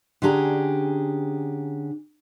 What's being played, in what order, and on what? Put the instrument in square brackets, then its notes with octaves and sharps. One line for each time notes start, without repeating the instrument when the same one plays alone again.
[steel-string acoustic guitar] D3 C#4 D4 G4 G#4 A#5